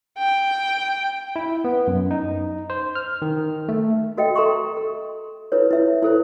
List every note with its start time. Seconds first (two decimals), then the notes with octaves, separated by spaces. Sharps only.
0.19 G5
1.36 E4
1.64 B3
1.87 F#2
2.11 D#4
2.70 C5
2.95 F6
3.22 D#3
3.69 A3
4.17 F#4 A4 D#5 E5 G5
4.35 A4 A#5 C6 C#6
4.77 A4
5.52 E4 F4 A4 B4 C#5
5.71 E4 E5
6.03 E4 F4 A4 B4 C5